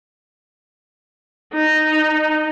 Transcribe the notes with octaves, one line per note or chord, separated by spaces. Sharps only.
D#4